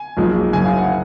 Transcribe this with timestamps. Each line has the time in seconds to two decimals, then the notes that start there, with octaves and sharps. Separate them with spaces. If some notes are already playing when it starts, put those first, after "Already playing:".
Already playing: G#5
0.17 B1 A#2 F3 G#3
0.53 F#1 F#2 C#3 G#5
0.65 F5
0.78 F#5